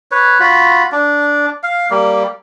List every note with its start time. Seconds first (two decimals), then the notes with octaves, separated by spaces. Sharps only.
0.11 B4 C#5
0.40 F4 F#4 B5
0.92 D4
1.63 F5
1.90 G3 A#3